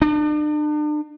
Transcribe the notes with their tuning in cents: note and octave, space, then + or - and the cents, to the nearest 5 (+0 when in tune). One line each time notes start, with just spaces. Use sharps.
D4 +40